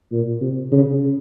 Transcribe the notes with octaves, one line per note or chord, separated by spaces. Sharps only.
A#2
C3
C#3